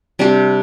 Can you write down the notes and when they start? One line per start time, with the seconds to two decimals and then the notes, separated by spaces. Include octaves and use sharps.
0.19 C3 G3 D4 G4